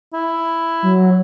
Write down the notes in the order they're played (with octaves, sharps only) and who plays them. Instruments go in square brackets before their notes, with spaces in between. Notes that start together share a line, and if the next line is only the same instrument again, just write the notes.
[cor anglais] E4
[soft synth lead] F#3